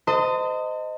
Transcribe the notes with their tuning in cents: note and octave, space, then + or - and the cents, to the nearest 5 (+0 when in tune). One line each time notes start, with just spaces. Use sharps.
C5 -30 D#5 +0 A5 +45